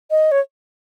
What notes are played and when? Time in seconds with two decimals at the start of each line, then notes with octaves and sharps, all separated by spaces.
0.11 D#5
0.32 C#5